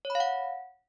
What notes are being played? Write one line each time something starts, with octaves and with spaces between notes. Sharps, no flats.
C#5
B5
F5
F#5